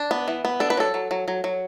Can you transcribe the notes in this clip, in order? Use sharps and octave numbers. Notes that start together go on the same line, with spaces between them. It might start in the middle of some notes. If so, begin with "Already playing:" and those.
Already playing: D4
B3
E3
B3
D4 A4
B4
F#3 A4
F#3
F#3
F#3
F#3